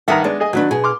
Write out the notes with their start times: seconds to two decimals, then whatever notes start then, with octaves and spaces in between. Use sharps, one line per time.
0.08 G2 D#3 E5 F#5 A#5
0.24 G#3 B3 D4
0.40 G#4 D#5 G#5
0.53 D#3 F#3 B3 D4 B4
0.71 B2 G#4
0.84 C6 D6 F6